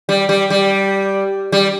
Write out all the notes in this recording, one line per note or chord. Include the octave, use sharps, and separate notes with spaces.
G3
G3
G3
G3